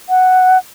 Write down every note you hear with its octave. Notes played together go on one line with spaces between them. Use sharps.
F#5